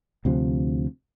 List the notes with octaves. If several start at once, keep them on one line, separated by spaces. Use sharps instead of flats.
D2 C3 F3